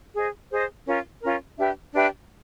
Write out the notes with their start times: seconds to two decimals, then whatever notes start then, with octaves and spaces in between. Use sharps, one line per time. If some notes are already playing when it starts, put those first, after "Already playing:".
0.14 G#4 C5 D#5
0.51 G#4 C5 D#5
0.86 C#4 F4 A#4
1.21 C#4 F4 A#4
1.57 D4 G4 B4 E5
1.93 D4 G4 B4 E5